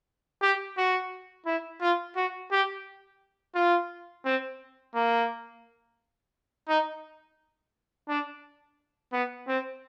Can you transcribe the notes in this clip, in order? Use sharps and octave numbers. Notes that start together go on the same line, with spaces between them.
G4
F#4
E4
F4
F#4
G4
F4
C4
A#3
D#4
D4
B3
C4